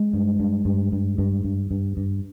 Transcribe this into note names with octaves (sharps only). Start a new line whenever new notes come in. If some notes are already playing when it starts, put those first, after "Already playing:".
Already playing: G#3
G2
G2
G2
G2
G2
G2
G2
G2